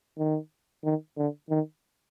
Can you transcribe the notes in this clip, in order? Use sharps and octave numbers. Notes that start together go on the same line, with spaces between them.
D#3
D#3
D3
D#3